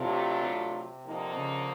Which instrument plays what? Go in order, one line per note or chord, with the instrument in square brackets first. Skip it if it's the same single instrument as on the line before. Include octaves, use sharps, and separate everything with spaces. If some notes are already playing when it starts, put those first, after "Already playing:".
Already playing: [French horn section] A2 F#3 A3 D4 F4 [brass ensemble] C3
[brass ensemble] C3
[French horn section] D3 F3 A#3 D#4
[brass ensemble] C#3